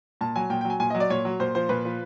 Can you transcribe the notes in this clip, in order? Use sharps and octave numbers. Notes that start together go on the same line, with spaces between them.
A#2 A5
F#3 G#5
A#2 G5
F#3 G5
G#5
A#2 G#5
D#5
F#3
D5
A#2 C#5
F#3
A#2 C5
F3 C5
A#2 B4
F3